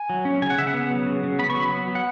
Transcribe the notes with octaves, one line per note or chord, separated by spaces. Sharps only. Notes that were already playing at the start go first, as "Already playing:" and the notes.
Already playing: G#5
F#3
C#4
C#3 G#5
F#5
C#3 E5
F#5
B3
F#3
C#3
C#3
B3 B5
C#6
F#3
B5
B3
F#3
F#5